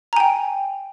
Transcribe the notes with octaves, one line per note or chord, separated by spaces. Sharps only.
G5 G#5 A#5